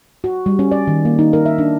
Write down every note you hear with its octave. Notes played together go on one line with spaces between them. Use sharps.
F#4
G3
C#4
D5
D#3
A#3
D#4
A#4
E5
D4